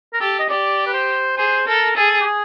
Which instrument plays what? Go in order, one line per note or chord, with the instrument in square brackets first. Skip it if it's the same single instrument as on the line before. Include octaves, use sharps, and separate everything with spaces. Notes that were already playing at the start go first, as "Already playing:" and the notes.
[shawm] A#4
[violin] G4 [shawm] A4
[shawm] D#5
[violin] G4 [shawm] D5
[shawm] B4
C5
[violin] G#4 [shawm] C5
[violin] A4 [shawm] A#4
[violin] G#4 [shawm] A4
[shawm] G4
G#4